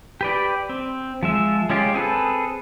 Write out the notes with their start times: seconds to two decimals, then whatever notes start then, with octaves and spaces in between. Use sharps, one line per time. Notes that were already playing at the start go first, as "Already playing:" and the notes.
0.21 G4 B4 D5
0.69 C4
1.23 F3 G#3 E5
1.70 G#3 C#4 F4 G4
1.94 C4 G#4 A4 B4